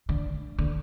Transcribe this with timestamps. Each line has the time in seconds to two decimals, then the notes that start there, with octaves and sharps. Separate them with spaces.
0.09 D3
0.59 D3